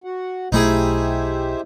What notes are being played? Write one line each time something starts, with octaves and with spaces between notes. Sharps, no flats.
F#4 F#5
B1 A3 D#4 E4 G4 G#4 C5 E5